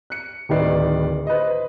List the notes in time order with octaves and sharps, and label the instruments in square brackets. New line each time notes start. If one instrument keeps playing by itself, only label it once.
[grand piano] F#6 C#7
D1 D#3 D#4 B4 D5 C7
B4 C5 D#5